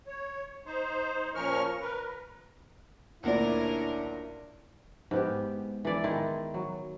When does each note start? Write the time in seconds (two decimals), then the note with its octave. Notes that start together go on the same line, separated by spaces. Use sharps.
0.07 C#5
0.65 D#4 C5
1.35 A#2 F3 C#4 A#4 C#6 F6
1.81 A#4 B4
3.23 D2 A#2 C#4 D4 E4 A#4 D5
5.11 G#2 B3 G4
5.85 E3 D4 D5 E5
6.04 D#3 G#3 E4
6.54 F#3